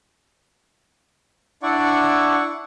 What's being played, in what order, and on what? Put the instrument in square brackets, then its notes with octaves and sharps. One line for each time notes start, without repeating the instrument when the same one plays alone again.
[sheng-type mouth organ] D4 E4 D5 F#5 C#6